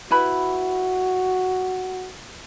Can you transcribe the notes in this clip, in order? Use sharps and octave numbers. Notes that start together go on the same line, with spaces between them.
E4 F#4 B4 B5